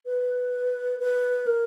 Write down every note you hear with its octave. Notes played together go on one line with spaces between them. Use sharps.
B4
B4
A#4